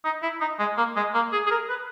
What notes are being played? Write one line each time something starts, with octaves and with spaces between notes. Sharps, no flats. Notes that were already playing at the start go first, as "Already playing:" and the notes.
D#4
E4
D#4
G#3
A#3
G#3
A#3
G#4
G#4
A#4
B4